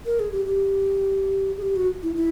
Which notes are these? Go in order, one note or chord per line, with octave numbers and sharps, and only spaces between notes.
A#4
G#4
G4
G4
G#4
G4
F#4
E4
E4